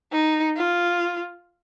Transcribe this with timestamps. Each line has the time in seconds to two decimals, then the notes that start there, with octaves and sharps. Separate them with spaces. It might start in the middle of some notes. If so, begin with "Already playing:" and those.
0.12 D#4
0.56 F4